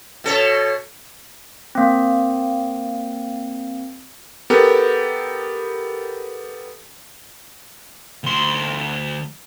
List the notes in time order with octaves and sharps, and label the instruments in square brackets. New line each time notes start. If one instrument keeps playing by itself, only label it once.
[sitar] B2 A4 C#5
[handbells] A#3 C4
[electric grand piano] B3 G4 A4 A#4
[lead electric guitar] D2 C6